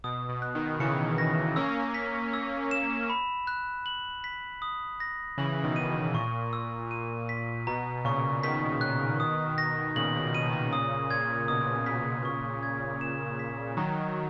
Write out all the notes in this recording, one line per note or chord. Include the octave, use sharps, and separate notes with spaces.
B2 D#6
B2
F#6
B2 D#3
C#3 E3 C#7
A#6
A#3 C#4 E6
B6
E6
E7
B5
F#6
F#7
B6
D#6
A#6
C#3 E3 F#7
B2 D#3
D#7
B2
A#2 C#6
E6
D#7
B6
B2 A#5
A#2 C#3 C#6
B2 D#3 B6
F#6
D#6
A#6
A#2 C#3 F#7
B2
B2 D#7
B2 D#3
A#2 C#3 D#6
A#2 G#6
B2 D#6
A#2 C#3 B6
C#6
G#6
E7
B6
D#3 F#3 A#5